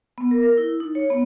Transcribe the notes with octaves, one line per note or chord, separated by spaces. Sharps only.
B3
A#4
A#4
E4
D#4
C#5
B3